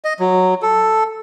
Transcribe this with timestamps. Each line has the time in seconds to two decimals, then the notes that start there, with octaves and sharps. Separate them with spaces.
0.04 D#5
0.19 F#3
0.62 A4